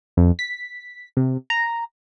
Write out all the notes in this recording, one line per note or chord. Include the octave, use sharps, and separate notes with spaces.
F2
B6
C3
A#5